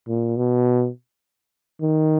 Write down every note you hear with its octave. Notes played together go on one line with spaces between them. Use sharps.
A#2
B2
D#3